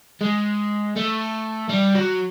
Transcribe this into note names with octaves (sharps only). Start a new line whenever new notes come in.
G#3
A3
G3
F#3